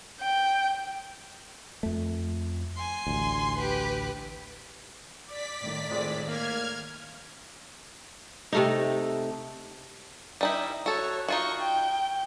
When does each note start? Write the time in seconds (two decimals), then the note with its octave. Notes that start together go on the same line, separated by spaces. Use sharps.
0.20 G5
1.83 F2 A3
2.76 G#5 C6
3.07 A1 D2
3.58 G4 B4
5.25 D5 B6
5.61 A2 D#3
5.90 F2 G#3
6.27 A#3 F6 G#6
8.53 C3 A3 D#4
10.41 G3 D#4 E4
10.86 F#4 A4 C#5
11.28 D#4 F4 F#4 C#6
11.61 G5